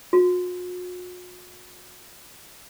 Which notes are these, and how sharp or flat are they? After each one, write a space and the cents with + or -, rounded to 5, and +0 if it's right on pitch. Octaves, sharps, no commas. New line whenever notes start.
F#4 -45